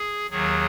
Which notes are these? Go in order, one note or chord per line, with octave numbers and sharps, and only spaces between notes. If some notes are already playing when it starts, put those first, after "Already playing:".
Already playing: G#4
D#2 D#3 F#3 G#4